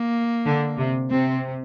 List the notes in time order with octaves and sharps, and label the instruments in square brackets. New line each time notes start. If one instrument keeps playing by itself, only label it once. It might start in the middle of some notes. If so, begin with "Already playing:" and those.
Already playing: [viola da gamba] A#3
[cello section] D3
C3
[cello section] C3 [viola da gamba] C4